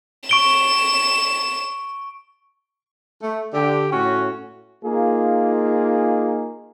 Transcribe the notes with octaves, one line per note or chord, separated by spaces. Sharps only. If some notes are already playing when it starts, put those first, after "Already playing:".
C#6 D7 E7 G7
A3
D3 G4
A2 C#4 F#4
A#3 D#4 F4 G#4